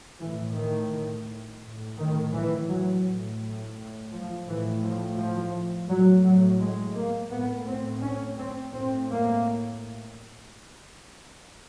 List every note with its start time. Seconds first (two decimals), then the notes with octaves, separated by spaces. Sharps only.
0.20 A2 E3
0.56 D#3
1.63 A2
1.98 D#3
2.34 E3
2.68 F#3
3.05 A2
4.12 F3
4.47 A2 E3
4.82 F3
5.18 F3
5.89 A2 F#3
6.24 F#3
6.60 G#3
6.95 A#3
7.31 A2 B3
7.67 C4
8.02 C#4
8.37 C4
8.73 A2 C4
9.09 A#3